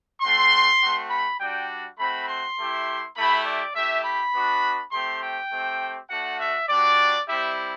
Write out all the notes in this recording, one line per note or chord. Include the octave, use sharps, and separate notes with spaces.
A3 C4 F#4 C6
A3 C4 F#4
B5
G3 D4 F#4 G5
A3 C4 F#4 B5
C6
A3 E4 G4
A3 E4 G4 B5
D5
A3 E4 G4 E5
B5
B3 D4 F#4
A3 C4 G4 C6
G5
A3 C4 G4
A3 D4 F#4 F#5
E5
G3 D4 F#4 D5
G3 C4 E4 G4 E5